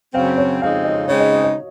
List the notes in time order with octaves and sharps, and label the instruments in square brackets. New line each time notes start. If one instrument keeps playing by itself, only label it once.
[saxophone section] F#2 C#3 F#3 C4 [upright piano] F5
[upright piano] C#5
[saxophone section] F2 C#3 G#3 C4 D#4 [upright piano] F5
[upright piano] D#5
[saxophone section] C#3 G#3 C4 D#4 [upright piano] C#5
[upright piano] D#5
D#5
D#5